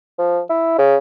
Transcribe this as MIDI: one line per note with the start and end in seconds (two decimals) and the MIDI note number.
0.18 0.40 53
0.50 0.76 64
0.78 0.96 49